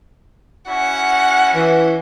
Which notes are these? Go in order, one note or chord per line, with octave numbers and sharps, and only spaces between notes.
C#4 E4 F#4 F#5
E3